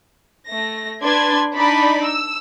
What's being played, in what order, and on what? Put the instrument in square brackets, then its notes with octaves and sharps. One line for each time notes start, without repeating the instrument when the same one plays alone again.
[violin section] A3 A#6
D4 B4 D5 C6 G#6 A6
D4 D#4 D5 B5
E6